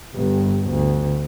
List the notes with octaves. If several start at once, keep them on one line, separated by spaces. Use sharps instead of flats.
G1 G2
D2